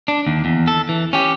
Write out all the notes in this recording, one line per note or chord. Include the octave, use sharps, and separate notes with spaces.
D4
D#2
E2
A4
E3
C#4 G4